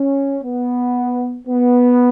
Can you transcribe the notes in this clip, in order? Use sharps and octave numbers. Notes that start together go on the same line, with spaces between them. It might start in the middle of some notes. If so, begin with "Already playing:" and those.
Already playing: C#4
B3
B3